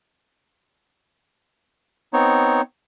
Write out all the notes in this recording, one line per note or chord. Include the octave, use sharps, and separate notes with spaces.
B3 C4 D#4 C#5